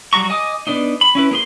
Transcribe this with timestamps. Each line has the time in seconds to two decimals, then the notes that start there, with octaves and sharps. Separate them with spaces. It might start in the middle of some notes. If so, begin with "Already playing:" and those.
0.13 F#3 G3 F#4 A#5 C#6
0.30 D#5 G#5 D6 D#6
0.67 B3 D4 D#4
1.01 B5
1.15 C#4 E4 B4
1.31 A#3 G#4 C6